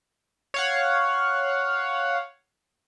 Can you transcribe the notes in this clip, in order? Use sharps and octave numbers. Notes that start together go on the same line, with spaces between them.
C#5 F5 F#5